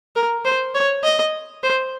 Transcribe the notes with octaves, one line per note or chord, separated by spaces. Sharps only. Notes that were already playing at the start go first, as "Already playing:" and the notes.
A#4
C5
C#5
D#5
C5